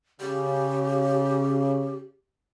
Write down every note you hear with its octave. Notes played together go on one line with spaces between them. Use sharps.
C#3 G4